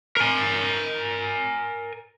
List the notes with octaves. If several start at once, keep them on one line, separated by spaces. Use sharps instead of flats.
A#4 G#5